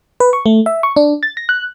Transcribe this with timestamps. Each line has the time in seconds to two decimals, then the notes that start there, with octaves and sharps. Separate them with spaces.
0.20 B4
0.33 C#6
0.46 A3
0.66 E5
0.83 C#6
0.96 D4
1.23 A6
1.37 A#6
1.49 F#6